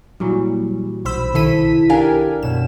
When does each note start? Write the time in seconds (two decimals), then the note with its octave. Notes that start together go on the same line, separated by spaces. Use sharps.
0.20 A#2 E3 F#3 G3
1.05 B1 C5 B5 E6
1.34 C2 D#3 E4 A4 B6 D#7
1.89 D4 G4 A#4 F5 G#5
2.43 F#2 B2 E7